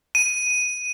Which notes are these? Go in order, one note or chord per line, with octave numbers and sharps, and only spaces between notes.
D#7